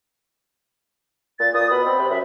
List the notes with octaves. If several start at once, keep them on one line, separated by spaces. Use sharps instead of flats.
A#2 A6
A#2 D#6
B2 B5
C4
C3
F#2 E5